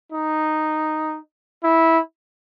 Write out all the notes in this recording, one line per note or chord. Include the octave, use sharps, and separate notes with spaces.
D#4
E4